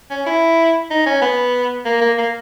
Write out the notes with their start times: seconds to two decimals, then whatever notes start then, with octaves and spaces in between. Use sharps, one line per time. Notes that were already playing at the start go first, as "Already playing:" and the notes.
0.10 C#4
0.26 E4
0.90 D#4
1.06 C#4
1.22 B3
1.85 A#3
2.01 A#3
2.18 A#3